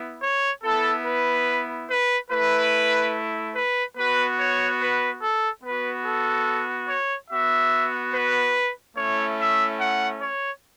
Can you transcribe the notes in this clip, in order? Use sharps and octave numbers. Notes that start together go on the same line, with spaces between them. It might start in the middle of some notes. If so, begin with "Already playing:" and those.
Already playing: B3 E4
C#5
B3 E4 A4
B4
B4
A3 E4 B4
B4
B3 F#4 B4
C#5
B4
A4
B3 F#4 B4
A4
C#5
B3 F#4 E5
B4
A3 C#4 E4 C#5
E5
F#5
C#5